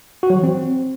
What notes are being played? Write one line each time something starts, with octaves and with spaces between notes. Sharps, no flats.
F#4
F#3
E3
C4